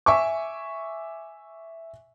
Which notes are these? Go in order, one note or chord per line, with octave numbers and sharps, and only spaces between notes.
E5 G#5 C#6 D6